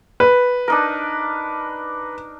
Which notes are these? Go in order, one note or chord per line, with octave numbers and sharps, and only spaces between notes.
B4
D4 D#4 A#4